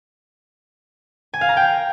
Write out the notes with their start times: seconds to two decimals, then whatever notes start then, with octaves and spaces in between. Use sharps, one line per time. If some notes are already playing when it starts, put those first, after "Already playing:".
1.34 G#5
1.41 F5
1.49 A#5
1.57 G5